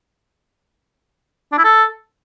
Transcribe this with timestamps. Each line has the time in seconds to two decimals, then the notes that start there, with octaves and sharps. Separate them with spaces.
1.52 D4
1.58 E4
1.64 A4